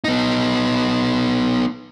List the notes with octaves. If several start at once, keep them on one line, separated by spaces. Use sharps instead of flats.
B3 D#4